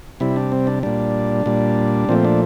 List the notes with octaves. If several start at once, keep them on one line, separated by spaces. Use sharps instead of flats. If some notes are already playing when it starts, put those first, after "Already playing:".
C3 G3 E4
D4
C4
D4
A#2 G3 D4
A#2 G3
A#2 F3 A3 C4
D4